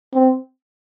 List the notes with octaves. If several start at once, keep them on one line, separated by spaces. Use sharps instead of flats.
C4